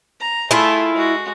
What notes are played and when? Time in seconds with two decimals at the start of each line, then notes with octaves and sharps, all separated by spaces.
0.20 A#5
0.51 A3 E4 F4 G#4
0.94 G#3 F#4